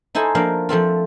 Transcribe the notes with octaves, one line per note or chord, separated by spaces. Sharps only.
D#4 E4 A4 C5 G#5
F3 A#3 D4 F5
F3 A3 C4 F4